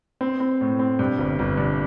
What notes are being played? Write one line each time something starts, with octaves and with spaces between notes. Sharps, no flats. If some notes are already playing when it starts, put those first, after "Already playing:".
C4
C4
A2
C4
G2
G1
G1
G2